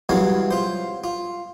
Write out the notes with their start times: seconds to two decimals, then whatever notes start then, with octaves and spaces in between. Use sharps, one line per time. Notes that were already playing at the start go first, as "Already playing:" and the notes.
0.09 C2 E3 F#3 G#3 F5
0.51 F4 C5
1.04 F4